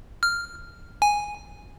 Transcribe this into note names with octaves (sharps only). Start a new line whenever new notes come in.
F6
G#5